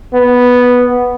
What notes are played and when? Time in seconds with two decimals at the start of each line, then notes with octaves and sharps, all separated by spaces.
0.14 B3